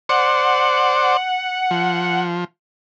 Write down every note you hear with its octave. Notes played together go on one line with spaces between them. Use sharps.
C5 D5 F#5
F3